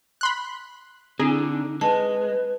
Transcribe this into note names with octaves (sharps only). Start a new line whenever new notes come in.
B5 C6 F#6
D3 C4 E4 G#4
D#4
G#3 B4 A5